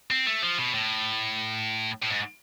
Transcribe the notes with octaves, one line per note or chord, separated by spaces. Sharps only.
C4
A3
F3
B2
A2
A2
G#2